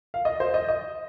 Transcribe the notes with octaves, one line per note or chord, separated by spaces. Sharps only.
F5
D#5
C5
D#5
D#5